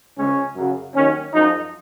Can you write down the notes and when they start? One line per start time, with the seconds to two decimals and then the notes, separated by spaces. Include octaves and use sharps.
0.18 C#2 C#3 F3 G#3 C#4
0.56 F#2 C#3 F#3
0.95 D#2 D#3 F#3 C#4
1.33 F#2 F3 G#3 D#4